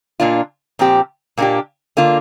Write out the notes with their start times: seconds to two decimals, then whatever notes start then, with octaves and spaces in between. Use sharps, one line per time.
0.20 A#2 A#3 D4 F4
0.79 A#2 F3 C4 G4
1.37 A#2 A#3 D4 G4
1.97 D3 A#3 F4